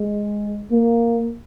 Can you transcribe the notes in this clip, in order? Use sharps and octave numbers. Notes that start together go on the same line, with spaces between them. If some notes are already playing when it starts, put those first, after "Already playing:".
Already playing: G#3
A#3